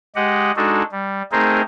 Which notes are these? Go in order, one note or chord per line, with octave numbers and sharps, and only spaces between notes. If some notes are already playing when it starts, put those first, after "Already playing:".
G#3 G4 D#5 F#5
G#3 D4 D#4 F#4 A4
G3
A3 C4 D#4 G#4 A#4 C5